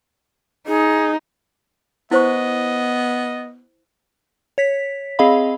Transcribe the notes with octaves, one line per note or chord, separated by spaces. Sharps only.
D#4 G#4
B3 E4 C5 D#5 C#6
C#5 B6
C4 G#4 D#5 F5 B5